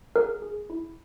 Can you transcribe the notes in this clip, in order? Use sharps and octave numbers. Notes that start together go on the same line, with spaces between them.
G#4 A#4
G#4
E4